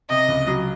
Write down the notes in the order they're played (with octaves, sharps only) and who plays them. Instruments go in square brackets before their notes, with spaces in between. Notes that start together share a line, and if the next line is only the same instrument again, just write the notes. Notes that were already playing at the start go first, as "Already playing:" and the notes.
[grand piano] C3 [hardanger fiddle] D#5
[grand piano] C#2
F#3